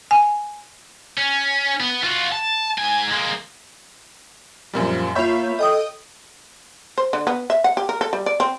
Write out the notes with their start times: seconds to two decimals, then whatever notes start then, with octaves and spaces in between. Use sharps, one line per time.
0.11 G#5
1.17 C#4
1.80 B3
2.04 F4 F#4
2.32 A5
2.78 G#2 G#5
3.11 G#3 A#3
4.73 F#2 A#2 F3 G3
5.15 A#3 F4 C#5 E5 B5 G6
5.59 A4 D#5 G5 D#6
6.98 C5
7.13 D3
7.27 B3
7.50 E5
7.64 F#5
7.77 G4
7.89 A#4
8.01 A4
8.13 G3
8.26 D5
8.40 C4